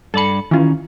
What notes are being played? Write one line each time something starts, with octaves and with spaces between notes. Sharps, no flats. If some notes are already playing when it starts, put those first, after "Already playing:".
G2 A4 D5 B5 C#7
D#3 E3 C#4 F4